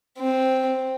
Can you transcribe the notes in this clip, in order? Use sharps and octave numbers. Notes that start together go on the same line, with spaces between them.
C4